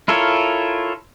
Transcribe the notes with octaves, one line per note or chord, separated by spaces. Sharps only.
E4 F4 A4 A#4 C#5